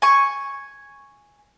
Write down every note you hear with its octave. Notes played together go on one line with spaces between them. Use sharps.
G#5 C#6